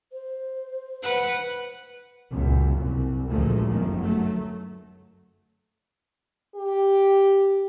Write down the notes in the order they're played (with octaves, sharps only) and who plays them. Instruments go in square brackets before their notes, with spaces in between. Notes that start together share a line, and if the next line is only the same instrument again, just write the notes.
[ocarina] C5
[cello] B4 F#5
[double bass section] C#2 F#2 A#2
C2
A1 D2 A#2 F3 G#3 A3
G1 F#2 D#3 F3
F#3 A3
[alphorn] G4